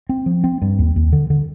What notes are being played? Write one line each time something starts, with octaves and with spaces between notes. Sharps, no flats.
C4
F3
C4
G2
D#2
D#2
D3
D3